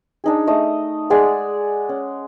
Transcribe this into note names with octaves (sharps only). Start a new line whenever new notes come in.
D4 D#4 G#4
A3 D#5
G#3 G#4 D5 F#5
C#4